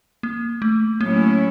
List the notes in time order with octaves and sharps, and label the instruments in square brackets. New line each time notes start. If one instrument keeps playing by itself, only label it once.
[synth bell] A#3
A3
[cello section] A2 F#3 A3 C#4 E4 [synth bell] A#3